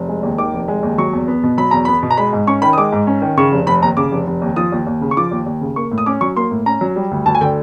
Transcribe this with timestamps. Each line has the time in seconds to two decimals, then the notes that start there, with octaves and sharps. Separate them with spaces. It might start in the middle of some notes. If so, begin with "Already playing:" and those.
Already playing: F1
0.09 G#3
0.23 D#2
0.38 D#3 D6
0.53 F1
0.68 G#3
0.83 D#2
0.98 F#3 C#6
1.13 E2
1.28 B3
1.43 B2
1.57 F#3 B5
1.71 E2 A#5
1.85 B3 B5
2.03 B2
2.11 A#5
2.17 G#3 B5
2.33 G#2
2.47 C#4 C#6
2.62 D#3 B5
2.73 D#6
2.77 G#3 D6
2.92 G#2
3.07 C#4
3.22 D#3
3.37 C#3 C#6
3.52 F1
3.67 F1 B5
3.82 D#2 A#5
3.97 C#3 D6
4.12 F1
4.27 F1
4.42 D#2
4.56 F3 D#6
4.72 D#2
4.87 D#2
5.01 C#3
5.11 C#6
5.17 F3 D6
5.31 D#2
5.46 D#2
5.61 C#3
5.76 A#3 C#6
5.92 A2
5.98 D#6
6.06 C#4 D6
6.21 F#3 C#6
6.36 A#3 C6
6.51 A2
6.66 C#4 A#5
6.81 F#3
6.96 G3
7.11 D2
7.26 D2 A5
7.35 G#5
7.41 D3 G5